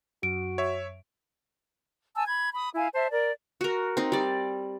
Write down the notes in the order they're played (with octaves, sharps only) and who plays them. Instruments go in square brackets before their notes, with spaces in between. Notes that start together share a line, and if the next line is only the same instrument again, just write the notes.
[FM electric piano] F#2 [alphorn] F#4 [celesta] D7
[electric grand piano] C#5 E5
[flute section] G#5 A5 E6
B5 G#6
B5 D#6
E4 F5 G#5
C5 E5 A5
A#4 D5
[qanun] F#4 A#4
C4 D#4
G3 D5